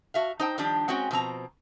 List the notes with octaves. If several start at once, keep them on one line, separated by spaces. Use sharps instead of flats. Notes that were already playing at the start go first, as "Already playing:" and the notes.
F#4 E5 F5
D#4 C5 G5
D#3 F3 G3 D4 G4
G#3 C4 C#4 F#4 E5 G5
B2 F3 C4 A#5